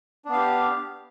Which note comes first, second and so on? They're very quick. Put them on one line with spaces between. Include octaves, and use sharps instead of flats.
D4 B3 F5 G4